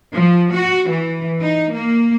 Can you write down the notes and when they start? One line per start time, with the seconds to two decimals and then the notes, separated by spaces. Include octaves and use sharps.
0.14 F3
0.53 F#4
0.90 E3
1.41 D#4
1.73 A#3